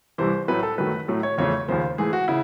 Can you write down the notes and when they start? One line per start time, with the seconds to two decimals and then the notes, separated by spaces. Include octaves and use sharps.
0.18 C2 C3 E3 C5
0.48 A2 F#3 A3 B4
0.63 A4
0.78 F#2 D#3 F#3 A3 B4
1.08 A2 F#3 A3
1.23 C#5
1.38 E2 C#3 F3 A3 C#5
1.68 D#2 C#3 F3 C5
1.98 G#2 E3 A3 G#4
2.13 F#4
2.28 C#3 E4